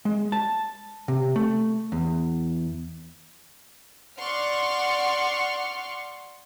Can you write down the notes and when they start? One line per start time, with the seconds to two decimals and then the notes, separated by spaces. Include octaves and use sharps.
0.05 G#3
0.32 A5
1.08 C3
1.36 A3
1.92 E2
4.18 D5 F#5 C6 C#6 F6